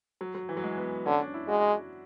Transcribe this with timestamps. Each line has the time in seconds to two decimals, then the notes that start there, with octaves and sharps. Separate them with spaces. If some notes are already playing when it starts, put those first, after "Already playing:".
0.21 F#3
0.35 F#3
0.49 E3
0.57 F#3
0.64 G#3
0.78 B3
1.06 D3 C#4
1.20 D4
1.34 E4
1.48 G#3 F#4